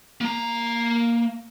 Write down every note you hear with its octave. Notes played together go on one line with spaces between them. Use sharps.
A#3 A#5